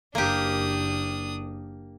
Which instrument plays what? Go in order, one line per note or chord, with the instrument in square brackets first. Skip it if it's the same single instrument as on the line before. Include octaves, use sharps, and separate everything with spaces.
[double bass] F#1 [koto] A#3 G4 [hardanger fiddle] D4 D#6